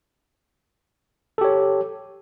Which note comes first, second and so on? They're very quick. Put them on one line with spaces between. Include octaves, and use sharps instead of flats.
A4 G4 C#5